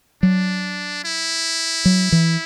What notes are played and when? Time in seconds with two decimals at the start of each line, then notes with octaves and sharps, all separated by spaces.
0.23 F#3 D4
1.04 E4
1.85 F#3
2.12 E3